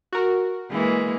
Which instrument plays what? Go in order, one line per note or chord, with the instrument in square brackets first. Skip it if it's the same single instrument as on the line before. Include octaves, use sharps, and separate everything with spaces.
[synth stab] F#4 A#4
[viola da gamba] E3 G#3 A#3